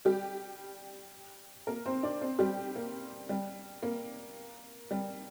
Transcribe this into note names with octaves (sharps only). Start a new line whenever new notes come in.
G3 G4
A#3 A#4
C4 C5
D4 D5
C4 C5
G3 G4
A#3
G3
A#3
G3